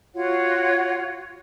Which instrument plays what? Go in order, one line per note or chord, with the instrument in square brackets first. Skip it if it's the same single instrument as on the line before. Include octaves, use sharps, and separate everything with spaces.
[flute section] F4 F#4 C#5 F#5